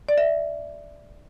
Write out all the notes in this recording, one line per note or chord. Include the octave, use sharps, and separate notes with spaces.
D5
E5